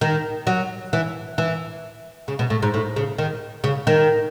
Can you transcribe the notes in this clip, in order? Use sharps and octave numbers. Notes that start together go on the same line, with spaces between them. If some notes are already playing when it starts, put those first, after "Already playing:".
D#3
F#3
E3
E3
C#3
B2
A2
G#2
A2
C#3
D#3
C#3
D#3